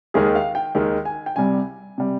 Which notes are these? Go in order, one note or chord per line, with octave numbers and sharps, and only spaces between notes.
D#2 D#3 G#3 G#4
F5
G5
D#2 D#3 G#3
G#5
G5
C2 C3 G3 G#5
C3 G3